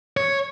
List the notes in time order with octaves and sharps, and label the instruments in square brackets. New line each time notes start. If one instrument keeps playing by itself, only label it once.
[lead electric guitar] C#5